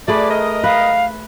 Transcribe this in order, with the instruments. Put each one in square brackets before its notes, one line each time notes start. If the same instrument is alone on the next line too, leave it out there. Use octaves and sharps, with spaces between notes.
[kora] A3 G#4 B4 [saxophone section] D5
[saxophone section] A#4 D#5
[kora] B4 [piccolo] F5